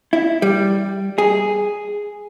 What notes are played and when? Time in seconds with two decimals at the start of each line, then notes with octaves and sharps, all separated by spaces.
0.13 E4
0.42 G3
1.18 G#4